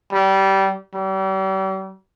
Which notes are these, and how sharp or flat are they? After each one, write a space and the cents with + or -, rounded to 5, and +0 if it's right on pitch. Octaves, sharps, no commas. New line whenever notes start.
G3 -20
G3 -40